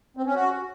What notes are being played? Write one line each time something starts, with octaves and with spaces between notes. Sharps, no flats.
C4
C#4
F#4